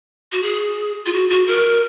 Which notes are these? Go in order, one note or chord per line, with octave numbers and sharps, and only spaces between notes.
F#4
G#4
F4
F#4
F#4
A#4